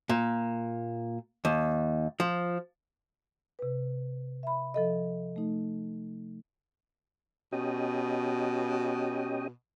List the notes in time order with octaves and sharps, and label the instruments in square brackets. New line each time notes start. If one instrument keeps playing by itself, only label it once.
[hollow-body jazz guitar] A#2
D#2
F3
[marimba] C3 B4
E5 B5
F3 A4 D#5
A3 D#4
[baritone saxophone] B2 [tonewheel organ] C#4 G4 D#5